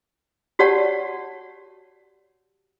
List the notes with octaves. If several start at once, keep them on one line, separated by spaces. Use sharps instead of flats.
F#4 G4 C#5 D5 F#5 A5